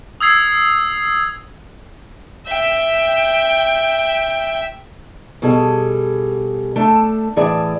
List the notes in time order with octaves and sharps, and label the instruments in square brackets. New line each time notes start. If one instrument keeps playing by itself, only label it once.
[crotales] D#6 E6 G#6 C7
[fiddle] E5 G5
[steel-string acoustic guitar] B2 G3 G#4 A4
A3 D4 A4
A2 E3 G#4 D5 A5